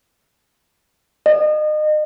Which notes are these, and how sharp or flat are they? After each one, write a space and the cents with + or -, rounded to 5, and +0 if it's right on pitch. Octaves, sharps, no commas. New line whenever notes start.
D#5 -35